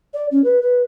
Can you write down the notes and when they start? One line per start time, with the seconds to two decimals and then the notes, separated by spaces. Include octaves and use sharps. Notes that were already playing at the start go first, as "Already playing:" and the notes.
0.14 D5
0.31 C#4
0.44 B4
0.62 B4